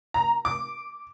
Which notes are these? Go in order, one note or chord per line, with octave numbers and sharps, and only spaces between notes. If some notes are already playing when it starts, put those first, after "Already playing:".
A#5
D6